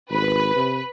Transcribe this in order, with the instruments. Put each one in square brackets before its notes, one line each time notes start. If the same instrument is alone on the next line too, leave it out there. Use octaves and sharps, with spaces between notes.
[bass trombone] G#1 [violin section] B4
[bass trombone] C3